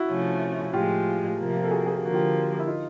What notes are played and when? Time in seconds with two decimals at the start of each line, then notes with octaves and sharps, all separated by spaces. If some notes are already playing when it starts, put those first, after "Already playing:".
Already playing: E4 F#4
0.09 C3 F3 A3 C#4
0.73 A2 F3 G#3 F4 G4
1.38 C3 F3 A#3
1.64 A4
1.71 F#4 G#4
1.86 G#4
1.96 G4
2.02 D3 F3 A#3 F#4
2.13 F4 G4
2.59 E4
2.67 D#4 F4